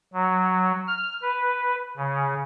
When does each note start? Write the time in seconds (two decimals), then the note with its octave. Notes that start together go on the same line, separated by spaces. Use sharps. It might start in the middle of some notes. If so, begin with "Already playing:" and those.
0.14 F#3
0.88 F6
1.22 B4
1.97 C#3